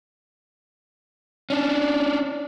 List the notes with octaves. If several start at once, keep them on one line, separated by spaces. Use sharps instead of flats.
C#4 D4